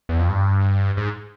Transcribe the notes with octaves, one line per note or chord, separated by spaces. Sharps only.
E2
F2
G2
G#2